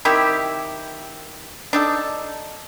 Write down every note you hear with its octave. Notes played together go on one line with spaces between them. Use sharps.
D#3 C4 E4 G4
D4 D#4 A4